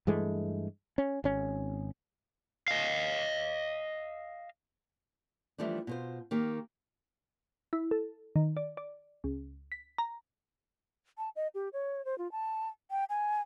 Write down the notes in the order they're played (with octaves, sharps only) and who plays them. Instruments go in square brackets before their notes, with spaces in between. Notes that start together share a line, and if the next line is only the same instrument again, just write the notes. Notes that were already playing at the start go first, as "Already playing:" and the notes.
[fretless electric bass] G2 E3 G#3 A3
C#4
G#1 C#4
[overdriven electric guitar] D#5 F5
[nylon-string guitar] E3 F3 G3 A3 D4
B2 F4 C5
D#3 A#3 G4
[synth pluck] E4
A4
D#3
D5
D5
C#2
B6
A#5
[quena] A5
D#5
G4
C#5
C5
F4
A5
G5
G#5